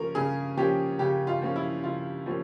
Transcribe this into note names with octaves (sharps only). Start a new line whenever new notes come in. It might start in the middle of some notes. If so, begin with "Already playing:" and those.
Already playing: C#3 F3 A#3 C#4 A#4
C#3 G#4
F3 A#3 C#4 G4
C#3 G4
F4
F3 A#3 C#4
E4
C#3 F4
F3 A#3 C#4